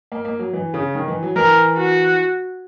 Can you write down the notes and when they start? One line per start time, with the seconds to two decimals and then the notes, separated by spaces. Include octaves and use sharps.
0.12 A#3
0.25 A#3
0.39 F#3
0.53 E3
0.74 C#3
0.95 D#3
1.08 E3
1.23 F#3
1.36 E3 A#4
1.77 F#4